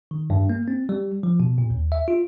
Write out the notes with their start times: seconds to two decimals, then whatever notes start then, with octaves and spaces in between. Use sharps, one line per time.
0.11 D#3
0.30 G2
0.50 A#3
0.68 C4
0.89 G3
1.23 F3
1.40 B2
1.58 A#2
1.70 D#2
1.92 E5
2.08 F4